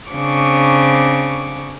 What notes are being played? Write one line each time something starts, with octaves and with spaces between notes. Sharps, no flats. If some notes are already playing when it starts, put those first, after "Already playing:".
C#3 C4 D4 C#6 D6